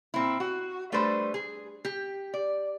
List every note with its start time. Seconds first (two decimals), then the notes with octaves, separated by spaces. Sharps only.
0.14 A#2 C4 E4
0.40 F#4
0.92 G3 A3 D4 A4 B4 C5
1.34 G#4
1.85 G4
2.34 D5